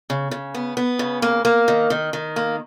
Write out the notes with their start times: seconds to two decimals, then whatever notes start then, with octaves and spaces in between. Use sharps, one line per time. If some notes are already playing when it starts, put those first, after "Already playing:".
0.10 C#3
0.31 C#3
0.54 B3
0.77 B3
0.99 C#3
1.22 A#3
1.45 A#3
1.68 D#3
1.90 D#3
2.13 D#3
2.36 A#3